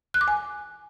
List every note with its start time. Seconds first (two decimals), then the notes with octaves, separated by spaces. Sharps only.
0.14 F#6
0.21 D6
0.28 G#5